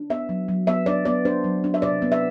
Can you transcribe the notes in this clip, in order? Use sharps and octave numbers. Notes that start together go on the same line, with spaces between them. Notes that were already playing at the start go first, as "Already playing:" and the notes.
Already playing: D4
B3 E5
F#3
F#3
B3 E5
D4 D5
B3 D5
D4 C5
F#3
D4
E5
C3 D5
B3
E5